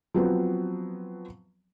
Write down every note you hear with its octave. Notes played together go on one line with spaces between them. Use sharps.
F3 F#3 B3 C4